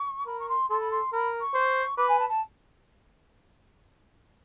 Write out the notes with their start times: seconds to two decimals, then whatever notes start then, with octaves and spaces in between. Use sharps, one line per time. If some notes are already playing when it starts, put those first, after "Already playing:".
Already playing: C#6
0.26 A#4 B5
0.39 C#6
0.49 C6
0.69 A4 C6
0.80 B5
0.91 C6
1.12 A#4 B5
1.40 C#6
1.54 C5
1.96 B4 D6
2.08 G#5
2.19 A5
2.29 A5